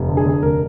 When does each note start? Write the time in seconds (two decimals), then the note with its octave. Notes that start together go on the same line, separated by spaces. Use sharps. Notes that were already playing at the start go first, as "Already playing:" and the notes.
Already playing: F1
0.09 D3
0.17 G#4
0.26 D3
0.43 F1 A#4